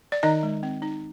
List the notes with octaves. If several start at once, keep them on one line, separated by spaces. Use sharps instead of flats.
D5
D#3 D#4 D#5
G#3
C4
D#4